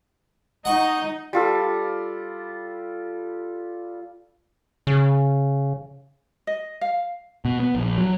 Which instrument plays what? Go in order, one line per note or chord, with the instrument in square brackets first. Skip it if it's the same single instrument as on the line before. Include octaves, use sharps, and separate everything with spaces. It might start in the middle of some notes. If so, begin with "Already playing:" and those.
[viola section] D#4 D#5 [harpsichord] F#5 C#6
[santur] G3 F4 A4
[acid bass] C#3
[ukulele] D#5
F5
[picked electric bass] B2
B3
A#1
F#3